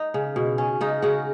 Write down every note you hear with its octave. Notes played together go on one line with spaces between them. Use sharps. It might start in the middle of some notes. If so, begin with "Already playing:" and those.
Already playing: D#4
C#3
B2
C#4
C#3 D#4
C#3 F#4